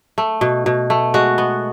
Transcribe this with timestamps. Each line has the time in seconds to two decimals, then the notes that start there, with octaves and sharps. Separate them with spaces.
0.18 A3
0.41 B2
0.66 B2
0.90 A3
1.14 G#3 F#4
1.38 B3